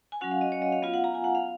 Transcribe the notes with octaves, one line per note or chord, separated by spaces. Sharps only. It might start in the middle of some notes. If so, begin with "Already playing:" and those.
G#5
F#3 C#4 F#4 F#5
F5
D#5
C#5
D#5
F5
B3 F4 F5
F#5
A#5
G#5
F#5
F5